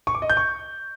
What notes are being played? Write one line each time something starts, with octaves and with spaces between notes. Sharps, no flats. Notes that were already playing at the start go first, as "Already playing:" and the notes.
C#6
D6
D#5
G6
C#6